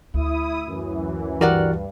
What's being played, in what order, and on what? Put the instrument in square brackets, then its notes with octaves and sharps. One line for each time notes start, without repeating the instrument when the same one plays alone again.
[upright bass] D2 [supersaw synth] E4 D#6
[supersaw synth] F#2 E3
[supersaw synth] G2 [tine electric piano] E3 F#4 G4 [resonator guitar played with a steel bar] A#4 D5 F#5